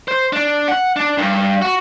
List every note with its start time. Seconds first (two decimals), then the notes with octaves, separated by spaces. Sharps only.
0.08 C5
0.33 D4
0.68 F#5
0.96 D4
1.18 G2
1.62 F#4